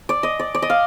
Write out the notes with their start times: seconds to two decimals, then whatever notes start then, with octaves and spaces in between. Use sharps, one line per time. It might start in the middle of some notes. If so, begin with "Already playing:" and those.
0.09 D5
0.23 D#5
0.39 D5
0.55 D5
0.62 D#5
0.70 F5